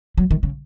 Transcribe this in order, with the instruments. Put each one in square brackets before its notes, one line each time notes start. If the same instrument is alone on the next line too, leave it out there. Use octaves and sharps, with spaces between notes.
[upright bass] F#3
D#3
C#3